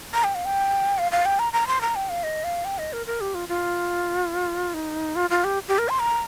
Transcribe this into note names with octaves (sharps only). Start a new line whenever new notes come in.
A#5
G5
F5
G5
F5
F5
G5
A#5
A#5
C6
A#5
G5
F5
D#5
F5
G5
D#5
A#4
A#4
G4
F4
F4
D#4
F4
F4
G4
G4
A#4
C6
A#5